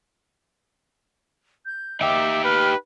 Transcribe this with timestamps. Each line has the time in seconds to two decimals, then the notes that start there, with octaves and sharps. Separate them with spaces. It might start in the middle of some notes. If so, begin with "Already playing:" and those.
1.65 G6
2.01 D#4 G4 E5 D6
2.44 B4 F6